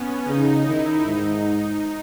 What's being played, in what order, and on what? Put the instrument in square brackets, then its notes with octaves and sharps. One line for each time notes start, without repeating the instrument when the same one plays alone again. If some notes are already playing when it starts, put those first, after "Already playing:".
Already playing: [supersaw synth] B3 C#4
[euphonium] C#3 [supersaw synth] D#4
[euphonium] D#3 [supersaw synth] E4
[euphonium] G#2 [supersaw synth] D#4